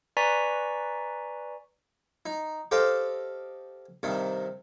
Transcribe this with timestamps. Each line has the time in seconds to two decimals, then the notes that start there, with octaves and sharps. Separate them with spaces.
0.17 B4 D5 G#5 A#5 C#6 B6
2.26 D#4
2.71 G4 A4 C5 D#5 F5 G5
4.03 G2 C3 D#3